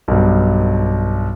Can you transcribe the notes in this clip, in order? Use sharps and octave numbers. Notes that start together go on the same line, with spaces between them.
B1 G2